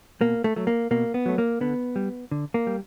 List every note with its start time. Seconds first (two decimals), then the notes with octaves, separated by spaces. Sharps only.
0.21 B2 A#3
0.44 A3
0.56 F#3 A3
0.67 A#3
0.91 B2 A#3
1.14 B3
1.26 F#3 A3
1.38 A#3
1.61 D3 B3
1.96 G3
2.31 D3
2.54 A#3
2.67 G3